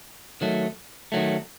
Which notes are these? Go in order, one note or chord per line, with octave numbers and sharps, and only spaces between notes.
D#3 F#3 A3
D#3 F#3 A3